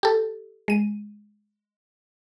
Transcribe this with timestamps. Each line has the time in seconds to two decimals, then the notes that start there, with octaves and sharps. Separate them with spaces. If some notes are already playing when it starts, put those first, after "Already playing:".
0.03 G4 A4
0.68 G#3 D#7